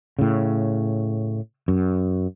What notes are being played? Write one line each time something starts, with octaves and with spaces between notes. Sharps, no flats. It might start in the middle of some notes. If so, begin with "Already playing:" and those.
A2 C#3
F#2